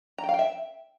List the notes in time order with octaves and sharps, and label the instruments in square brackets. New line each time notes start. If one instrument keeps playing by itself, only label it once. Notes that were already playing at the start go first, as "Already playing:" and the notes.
[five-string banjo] A#5
G5
F5
G5
E5